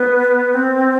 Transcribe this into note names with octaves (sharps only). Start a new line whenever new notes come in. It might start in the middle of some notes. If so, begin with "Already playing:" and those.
Already playing: B3
C4